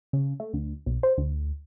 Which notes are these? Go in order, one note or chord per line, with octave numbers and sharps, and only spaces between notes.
C#3
A3
D2
B1
C5
D2